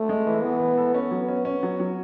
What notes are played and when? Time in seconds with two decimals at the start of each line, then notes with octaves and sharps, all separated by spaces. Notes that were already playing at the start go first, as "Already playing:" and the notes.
Already playing: A3
0.09 G#3
0.27 E3
0.43 E3 B3
0.60 E3
0.78 A4
0.94 B3 C#4
1.11 F#3
1.29 C#4
1.45 B3 C#4
1.63 F#3
1.80 F#3